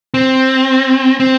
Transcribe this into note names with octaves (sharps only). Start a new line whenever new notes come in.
C4
C4